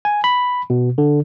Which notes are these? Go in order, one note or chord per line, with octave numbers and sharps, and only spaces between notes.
G#5
B5
B2
D3